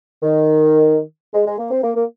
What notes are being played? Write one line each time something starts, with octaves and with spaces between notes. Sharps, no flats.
D#3
G#3
G#3
A#3
C4
A#3
A#3